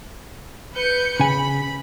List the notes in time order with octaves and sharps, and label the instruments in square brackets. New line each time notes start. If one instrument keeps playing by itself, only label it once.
[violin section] B4 G6 C#7
[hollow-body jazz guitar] C#3 G#5 [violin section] B5